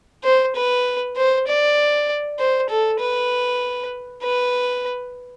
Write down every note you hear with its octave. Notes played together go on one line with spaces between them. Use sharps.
C5
B4
C5
D5
C5
A4
B4
B4